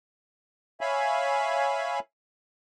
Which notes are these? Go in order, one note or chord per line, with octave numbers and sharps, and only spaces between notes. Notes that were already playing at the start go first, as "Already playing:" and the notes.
C#5 E5 F5 G#5 B5